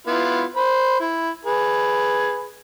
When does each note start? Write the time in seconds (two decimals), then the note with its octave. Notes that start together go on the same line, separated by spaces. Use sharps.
0.07 B3 E4 F4
0.56 C5 B5
1.00 E4
1.45 G#4 B4